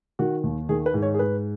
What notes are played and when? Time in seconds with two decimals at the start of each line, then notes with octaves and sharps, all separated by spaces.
0.19 D#3 F#4
0.44 D#2
0.69 D#3 G#4
0.86 B4
0.94 G#2
1.02 C#5
1.14 G#4
1.19 G#2 B4